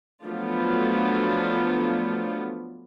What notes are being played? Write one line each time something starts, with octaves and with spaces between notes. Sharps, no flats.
F3 F#3 A3 B3 D4 F4